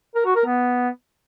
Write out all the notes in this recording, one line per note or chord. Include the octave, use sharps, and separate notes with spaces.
A#4
F#4
A#4
B3